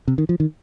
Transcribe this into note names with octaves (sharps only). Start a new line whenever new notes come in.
C3
D#3
F3
D#3